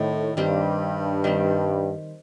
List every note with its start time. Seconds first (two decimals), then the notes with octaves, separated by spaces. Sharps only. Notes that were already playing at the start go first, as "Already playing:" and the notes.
Already playing: A2 D#3 C4
0.37 G2 D#3 G3 C4
1.24 D#3 G3 C4